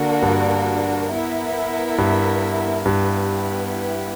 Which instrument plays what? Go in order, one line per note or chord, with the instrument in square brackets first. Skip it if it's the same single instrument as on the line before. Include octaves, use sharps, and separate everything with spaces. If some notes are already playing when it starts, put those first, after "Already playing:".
Already playing: [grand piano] D3 [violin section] A#3 D4 F#4 A#4
[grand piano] G2
[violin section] B3 E4 A#4 E5
[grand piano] G2
[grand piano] G2 [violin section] B3 E4 G4 B4